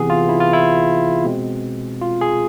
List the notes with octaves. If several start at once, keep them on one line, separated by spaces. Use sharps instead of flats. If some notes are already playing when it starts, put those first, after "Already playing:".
Already playing: C3 E3 B3 G#4
F4
E4
F4
E4
B2 G#3 C4
F4
G#4